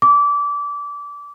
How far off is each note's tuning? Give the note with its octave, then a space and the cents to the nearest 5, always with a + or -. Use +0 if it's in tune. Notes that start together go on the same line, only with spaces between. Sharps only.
D6 -25